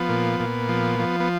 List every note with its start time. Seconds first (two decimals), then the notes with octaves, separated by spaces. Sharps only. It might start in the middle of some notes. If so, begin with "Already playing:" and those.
Already playing: F3 B3
0.09 A#2
0.40 A#2
0.69 F3
0.99 F3
1.20 B3